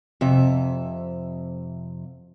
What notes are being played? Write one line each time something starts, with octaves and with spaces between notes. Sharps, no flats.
F2 C3 E5